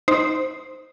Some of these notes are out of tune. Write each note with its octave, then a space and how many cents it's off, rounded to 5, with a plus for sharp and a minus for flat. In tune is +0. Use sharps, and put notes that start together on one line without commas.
D#4 +0 C5 +0